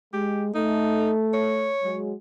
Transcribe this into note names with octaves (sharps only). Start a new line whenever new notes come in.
G#3 G4
A3 D#4
C#5
F#3 G#3